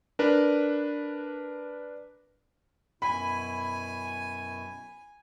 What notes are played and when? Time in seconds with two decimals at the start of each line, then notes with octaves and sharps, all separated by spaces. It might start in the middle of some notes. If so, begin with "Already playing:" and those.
0.19 D4 A#4 B4
3.02 F#2 B2 E4 G#5 B5